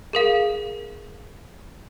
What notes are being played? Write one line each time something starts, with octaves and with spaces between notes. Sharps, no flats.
G#4 A#4 F5